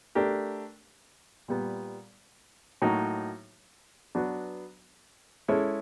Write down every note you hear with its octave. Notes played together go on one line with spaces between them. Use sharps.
A3 D4 G4 A#4
A#2 G3 B3
A2 F#3 A#3 D#4 F#4
F#3 B3 D4 F#4 B4
G#3 C#4 E4 A4